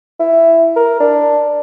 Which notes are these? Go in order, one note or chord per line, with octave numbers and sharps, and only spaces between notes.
E4
A#4
D4